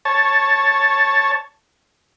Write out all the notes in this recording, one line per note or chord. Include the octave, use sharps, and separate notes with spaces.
C#5 A5